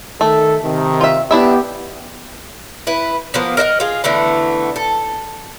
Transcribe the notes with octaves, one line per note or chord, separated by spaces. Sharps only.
D#3 A3 A4
C3 D#3
F4 E5
B3 D4 E4 G4 E5
E4 B4
F3 A#3 B3
A#4 D#5 E5 F#5
F4 G#4
D3 E3 A3 B3
A4